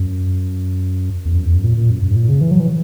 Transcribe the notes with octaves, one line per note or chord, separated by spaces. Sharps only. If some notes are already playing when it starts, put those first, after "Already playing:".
Already playing: F#2
E2
F#2
E2
F#2
A#2
A#2
F#2
F#2
G#2
A#2
C#3
E3
F#3
E3